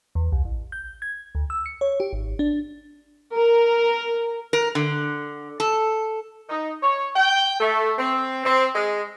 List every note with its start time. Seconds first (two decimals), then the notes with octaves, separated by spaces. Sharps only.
0.15 E2
0.32 C2
0.45 A1
0.72 G6
1.02 G#6
1.35 D2
1.50 E6
1.66 C#7
1.81 C#5
2.00 G4
2.13 G#1
2.39 D4
3.36 A#4
4.53 A#4
4.75 D3
5.60 A4
6.50 D#4
6.82 C#5
7.16 G5
7.60 A3
7.98 C4
8.45 C4
8.75 G#3